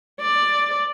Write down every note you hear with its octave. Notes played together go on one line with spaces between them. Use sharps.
D5